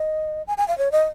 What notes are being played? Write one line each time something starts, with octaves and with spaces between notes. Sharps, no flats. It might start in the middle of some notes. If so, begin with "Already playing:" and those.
Already playing: D#5
G#5
G#5
F5
C#5
D#5